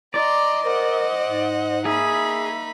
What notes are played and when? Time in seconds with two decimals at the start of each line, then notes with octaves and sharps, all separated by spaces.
0.14 D5 D#5 A#5 C6
0.65 A#4 C5 F#5
1.25 G#2
1.85 A#3 D#4 G#4 E5 B5